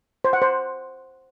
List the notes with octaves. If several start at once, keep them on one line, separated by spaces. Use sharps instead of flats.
C5
F#5
C5